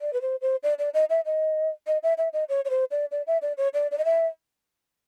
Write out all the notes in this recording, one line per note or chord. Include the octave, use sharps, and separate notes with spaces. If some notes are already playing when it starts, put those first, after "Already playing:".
D5
B4
C5
C5
D5
D5
D#5
E5
D#5
D#5
E5
E5
D#5
C#5
C#5
C5
D5
D5
E5
D5
C#5
D5
D5
D#5
E5